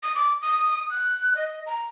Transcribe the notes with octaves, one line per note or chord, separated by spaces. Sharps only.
D#6
D6
D#6
F#6
D#5
A#5